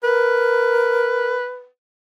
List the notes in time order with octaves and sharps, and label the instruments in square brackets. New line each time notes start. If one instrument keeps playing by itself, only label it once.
[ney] A#4 [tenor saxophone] B4